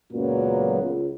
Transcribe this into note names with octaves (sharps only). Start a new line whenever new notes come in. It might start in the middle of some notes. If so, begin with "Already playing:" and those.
C#2 F#2 A#2 F#3 A#3 B3
C#2